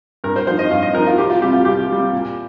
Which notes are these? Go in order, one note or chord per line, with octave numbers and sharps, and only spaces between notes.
G2 A#4
C5
F3 D#4 C5
D#5
G2 F5
D#5
F3 D#4 A#4
F4
C2 G4
F4
C3 G3 G4
F4
C2 G4
C3 G3
A#2